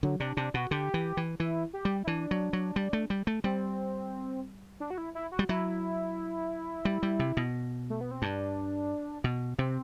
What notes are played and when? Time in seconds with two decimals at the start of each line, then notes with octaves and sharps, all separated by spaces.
0.03 D3 F#3
0.20 C3 D4
0.37 C3 D4
0.54 B2 F#4
0.71 D3 G4
0.94 E3
1.17 E3
1.39 E3 E4
1.73 G4
1.85 G3
2.04 E4
2.07 E3 D4
2.31 F#3
2.53 F#3
2.76 G3
2.93 A3
3.10 G3
3.27 A3
3.44 G3 C4
4.80 D4
4.90 F#4
4.98 E4
5.15 E4
5.32 F#4
5.39 G3
5.49 F#3 E4
6.85 G3
7.03 G3
7.19 C3
7.37 B2
7.90 A3
8.01 B3
8.11 C4
8.22 G2 D4
9.24 B2
9.58 C3 C4